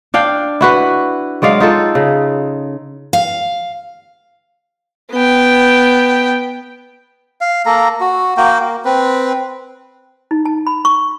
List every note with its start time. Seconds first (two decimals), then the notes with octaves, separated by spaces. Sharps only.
0.14 D4 F5 G5
0.61 E4 F#4 B4
1.42 F#3 G#3 D5 F5
1.60 D#4 F4 A4
1.95 C#3
3.13 F5
5.11 B3 G5
7.41 F5
7.66 A#3 A4 A#5
8.01 F#4
8.37 A#3 F#4 G5
8.61 A#3
8.85 C4 B4
10.31 D#4
10.45 A5
10.67 B5
10.85 C#6